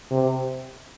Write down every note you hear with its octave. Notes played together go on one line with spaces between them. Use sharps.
C3